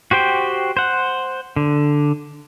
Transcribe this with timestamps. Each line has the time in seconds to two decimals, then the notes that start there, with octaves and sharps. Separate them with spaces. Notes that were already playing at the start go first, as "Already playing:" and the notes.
0.11 F#4 G4 C5 G5
0.77 C5 F#5
1.56 D3